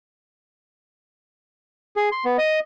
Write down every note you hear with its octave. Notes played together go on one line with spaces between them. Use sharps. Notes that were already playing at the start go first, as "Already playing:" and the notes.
G#4
C6
B3
D#5